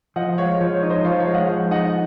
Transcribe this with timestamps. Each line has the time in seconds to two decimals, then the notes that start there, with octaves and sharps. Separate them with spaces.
0.16 F3 D#5 F#5
0.38 G#3 C#5 F5
0.60 F3 C#5
0.75 C#5
0.83 D#4
0.90 C5 D#5
1.05 F3 C#5 F5
1.20 C#5 F5
1.27 G#3
1.34 D#5 F#5
1.49 F3
1.71 D#4 D#5 F#5